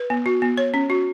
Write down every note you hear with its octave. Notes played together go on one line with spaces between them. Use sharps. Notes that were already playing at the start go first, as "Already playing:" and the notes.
Already playing: B4
B3
F#4
B3
C#5
C#4
F#4